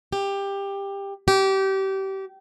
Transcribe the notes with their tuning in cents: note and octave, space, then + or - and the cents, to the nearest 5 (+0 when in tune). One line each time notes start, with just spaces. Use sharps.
G4 +15
G4 -25